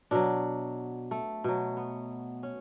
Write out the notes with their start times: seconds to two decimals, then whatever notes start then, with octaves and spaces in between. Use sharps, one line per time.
0.11 B2 F#3 D4
1.11 A3
1.44 B2 F#3
1.77 B3
2.43 C#4